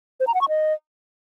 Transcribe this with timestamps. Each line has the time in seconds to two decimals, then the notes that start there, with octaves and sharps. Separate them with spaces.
0.20 C5
0.27 A#5
0.34 F#5
0.41 C#6
0.49 D#5